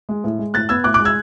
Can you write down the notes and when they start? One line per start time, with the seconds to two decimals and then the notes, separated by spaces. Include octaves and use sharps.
0.09 G#3
0.24 A2
0.39 G#3
0.54 A2 F#6 A6
0.69 B3 E6 G#6
0.84 A2 D6 F#6
0.94 D6 F#6
1.00 G#3
1.05 E6 G#6